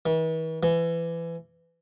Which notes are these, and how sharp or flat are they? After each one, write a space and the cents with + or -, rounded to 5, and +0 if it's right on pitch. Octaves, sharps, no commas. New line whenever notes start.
E3 -40
E3 +25